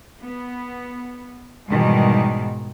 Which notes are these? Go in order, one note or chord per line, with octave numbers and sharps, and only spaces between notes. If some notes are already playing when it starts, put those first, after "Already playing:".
B3
G#2 B2 D#3 E3 G3